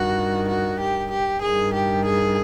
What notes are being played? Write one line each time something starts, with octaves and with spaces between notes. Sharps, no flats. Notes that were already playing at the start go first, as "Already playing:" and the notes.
Already playing: G2 D#3 F#4
F#4
G4
G4
G2 D#3 G#4
G4
G#4